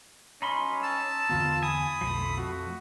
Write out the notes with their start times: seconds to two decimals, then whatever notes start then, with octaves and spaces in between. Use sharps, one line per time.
0.42 C#4 D#4 B5 C6
0.83 A5 E6
1.30 E2 D3 B3 F4
1.63 G#5 B5 D#6
2.01 B1 F2 F3 A3
2.37 F2 F#4